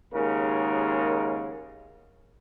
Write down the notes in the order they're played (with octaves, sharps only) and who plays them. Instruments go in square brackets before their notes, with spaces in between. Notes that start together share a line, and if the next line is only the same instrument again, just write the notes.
[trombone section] D#2 G#2 C#3 A#4